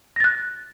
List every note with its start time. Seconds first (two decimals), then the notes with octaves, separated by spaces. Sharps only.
0.16 A#6
0.20 A6
0.24 F#6